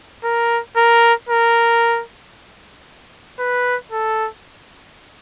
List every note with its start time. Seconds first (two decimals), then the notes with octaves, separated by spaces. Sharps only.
0.24 A#4
0.77 A#4
1.29 A#4
3.39 B4
3.92 A4